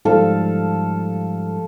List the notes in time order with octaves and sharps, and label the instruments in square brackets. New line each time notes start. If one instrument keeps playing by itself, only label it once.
[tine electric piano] G#2 F3 G3 [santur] A4 F5